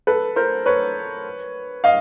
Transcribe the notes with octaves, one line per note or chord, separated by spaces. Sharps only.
A4 B4
A#4 C5
B4 C#5
D#5 F5